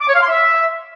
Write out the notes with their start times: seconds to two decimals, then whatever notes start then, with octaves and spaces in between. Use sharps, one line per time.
0.01 D6
0.08 C#5
0.15 F5
0.22 C6
0.29 E5